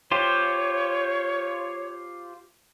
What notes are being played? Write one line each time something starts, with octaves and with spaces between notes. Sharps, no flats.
F4 G4 C5 C#5